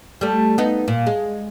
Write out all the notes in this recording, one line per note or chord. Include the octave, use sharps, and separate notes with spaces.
G3 A3
B3 D#4
A#2
G#3